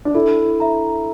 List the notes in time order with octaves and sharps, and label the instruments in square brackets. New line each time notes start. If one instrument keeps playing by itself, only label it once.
[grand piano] D4
[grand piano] E4 [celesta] A4
[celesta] E5 A#5